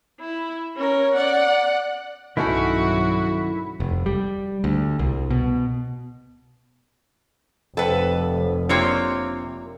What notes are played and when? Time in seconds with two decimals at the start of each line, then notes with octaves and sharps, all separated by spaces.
0.20 E4
0.76 C#4 A#4
1.14 D5 F#5
2.37 B1 G2 D#3 F#3 A3 C#4 E4 F#4
3.80 F1
4.06 G3
4.64 D2
4.99 C2
5.30 B2
7.77 F1 F2 A4 B4 F#5
8.69 C3 A#3 C4 D4 F4 C#5